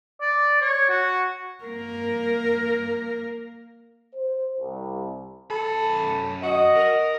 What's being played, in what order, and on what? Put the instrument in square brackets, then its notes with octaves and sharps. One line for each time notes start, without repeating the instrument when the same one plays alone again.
[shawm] D5
C#5
F#4
[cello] A#3 A#4
[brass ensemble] C5
C2
[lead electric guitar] F#2 B5 [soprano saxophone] A4
[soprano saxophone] F#4 [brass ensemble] D#5
[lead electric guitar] A#4